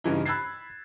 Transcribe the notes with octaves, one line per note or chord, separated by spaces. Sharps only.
G2 C#3 E3 D#4
B5 E6 F#6 G#6 A6 C7